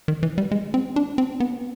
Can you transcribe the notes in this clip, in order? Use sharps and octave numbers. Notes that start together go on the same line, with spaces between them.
D#3
E3
G3
G#3
C4
D4
C4
B3